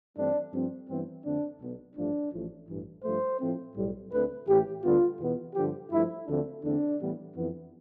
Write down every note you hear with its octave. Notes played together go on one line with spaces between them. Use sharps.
G2 E3 A3 C4 D4
G2 F3 A3 C4
G2 E3 G3 B3 C4
F2 D3 A3 C4 D4
B1 B2 B3
A1 G2 F3 A3 D4
A1 A2 F3
A1 G2 E3
G2 F3 A3 C5
A2 F3 A3 C4
B1 A2 G3
D2 D3 A3 C4 B4
A1 A2 E3 G4
D2 D3 G3 B3 F4
E2 B2 B3
G2 D3 F3 G4
G2 F3 A3 E4
D2 D3 F3 A3 C4 D4
E2 D3 A3 C4 D4
A2 E3 G3 B3
F2 E3 B3